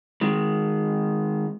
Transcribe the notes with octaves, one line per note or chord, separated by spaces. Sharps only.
D#3 G#3